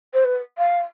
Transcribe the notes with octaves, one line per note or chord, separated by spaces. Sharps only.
C5
B4
F5